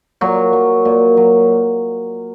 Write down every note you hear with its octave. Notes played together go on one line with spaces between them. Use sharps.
A#2 F#3
F#3
A#2
F#3